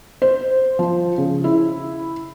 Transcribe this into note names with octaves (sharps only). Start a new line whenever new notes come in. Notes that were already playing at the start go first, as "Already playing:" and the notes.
C5
F3
C#3
E4